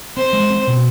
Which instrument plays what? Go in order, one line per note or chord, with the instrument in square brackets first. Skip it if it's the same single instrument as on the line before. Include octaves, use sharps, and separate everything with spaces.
[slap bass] C4 [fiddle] C5
[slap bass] G#3
C4
B2